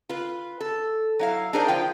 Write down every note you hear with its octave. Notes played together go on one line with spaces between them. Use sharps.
F4 B4
A4
F#3 E4 F5
D4 D#4 G#4 A#4 C5 D5
F3 F4 G5